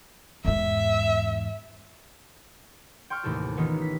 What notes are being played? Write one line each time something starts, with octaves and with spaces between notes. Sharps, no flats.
E2 G#2 E5
G5 C6 C#6 F6
A1 D#2 A2 C3 G4 A4
D#3 E3 B3 C#4 D#4 F4
B6